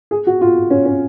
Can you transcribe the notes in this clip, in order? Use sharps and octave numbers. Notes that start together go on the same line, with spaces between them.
G#4
F#4
F4
C#4
C#4